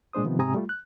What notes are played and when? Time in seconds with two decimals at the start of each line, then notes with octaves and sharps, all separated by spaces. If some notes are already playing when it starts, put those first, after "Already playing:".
0.13 A#2 G#3 D4 C5 D#6
0.24 C3 D#3 F3 B3
0.39 G#2 C3 C4 G#5 A#5 D#6
0.54 G3 A3 F4
0.69 F#6